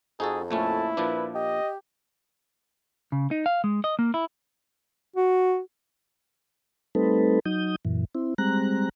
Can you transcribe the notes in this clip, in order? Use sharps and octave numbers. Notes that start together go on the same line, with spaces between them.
F2 D#4 F#4 G#4 A4
A#2 A3 C#4 E4 A5
A#2 F3 D4 B4
G4 D#5
C#3
D#4
F5
G#3
D#5
A#3
E4
F#4
G3 A3 C4 D#4 A4 B4
F#3 D#4 D#6 G6
F#2 A#2 E3
C4 E4
G3 G#3 C4 A#5 F#6